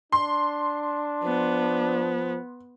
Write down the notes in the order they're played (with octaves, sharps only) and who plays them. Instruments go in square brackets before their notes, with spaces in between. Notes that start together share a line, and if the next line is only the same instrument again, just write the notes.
[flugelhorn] D4 [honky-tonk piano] C6
[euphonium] F3 [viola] B3